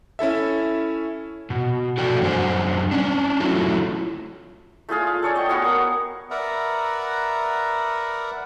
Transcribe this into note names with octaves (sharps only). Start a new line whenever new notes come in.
C#4 E4 A4 E5
B2
F#4 A4 D5 G5
F#2 G3 D4 C5 F#5 G#5
C#4 D4
F#3 A3 C#4 E4 F4
A3 F4 G#4 F5
F5
A4 C#5 D5
D#5 F#5 G5
B3 F#4 F5 G#5
A#4 F#5
A#4 B4 D5 E5 F#5 A#5